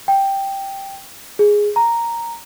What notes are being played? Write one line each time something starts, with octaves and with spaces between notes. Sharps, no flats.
G5
G#4
A#5